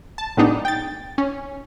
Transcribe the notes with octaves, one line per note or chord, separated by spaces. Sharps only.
A5
A2 F#3 G#3 B3 D4 D#4
G5 A6
C#4